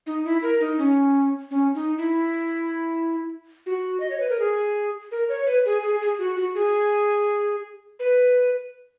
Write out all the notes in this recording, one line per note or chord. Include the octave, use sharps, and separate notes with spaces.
D#4
E4
A#4
D#4
C#4
C#4
D#4
E4
F#4
D#5
C#5
B4
A#4
G#4
A#4
C#5
B4
G#4
G#4
G#4
F#4
F#4
G#4
B4